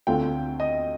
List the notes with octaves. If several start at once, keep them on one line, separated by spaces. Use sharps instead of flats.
D2 D3 A3 C4 F4 G5
D#5